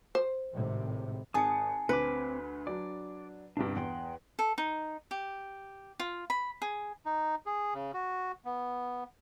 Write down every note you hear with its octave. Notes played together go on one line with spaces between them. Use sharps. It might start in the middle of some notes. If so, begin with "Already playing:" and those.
C5
G#1 A2 C3
G#1 G#4 A5 D#6 C#7
D2 C4 B4 D6
F#3 D4 D5
G1 C2 G2 D4 G4
E2 F#5 G5 C6
A4
D#4
G4
F4
B5
G#4
D#4
G#4
C#3
F#4
B3